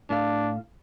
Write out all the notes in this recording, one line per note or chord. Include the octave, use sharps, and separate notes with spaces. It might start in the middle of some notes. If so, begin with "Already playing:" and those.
A2 D4 F5